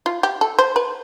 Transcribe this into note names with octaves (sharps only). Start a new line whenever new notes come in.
F4
G4
A4
C5
B4